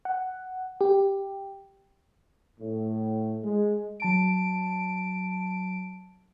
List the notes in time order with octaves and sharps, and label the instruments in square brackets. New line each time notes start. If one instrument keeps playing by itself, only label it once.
[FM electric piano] F#5
G4
[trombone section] A2
G#3
[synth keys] F#3 A5 D7